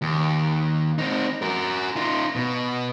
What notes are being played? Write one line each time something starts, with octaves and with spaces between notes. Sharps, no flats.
D#2
C4 D#4
F#4 A#4
D#4 F4
B2